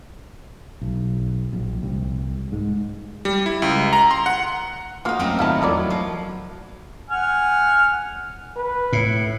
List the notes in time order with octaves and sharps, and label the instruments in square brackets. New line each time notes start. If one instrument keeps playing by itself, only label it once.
[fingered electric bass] B1
A#1
C2
G#2
[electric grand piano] G3
E4
C#2
A#5
C6
F#5
[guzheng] A#3 D#4 [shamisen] F4 F#4
[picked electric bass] F#2 [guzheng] A3 C4 A#4
[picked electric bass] G#1 D#3 [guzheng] F#3 B3 [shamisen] F4 E5 A5
[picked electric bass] E2 F3 [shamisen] E4 A#4 D5
[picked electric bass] F#3
[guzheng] F3
[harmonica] F#5 G#5 F6
[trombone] B4
[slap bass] A2